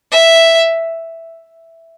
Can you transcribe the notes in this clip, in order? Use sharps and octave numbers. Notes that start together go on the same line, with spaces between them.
E5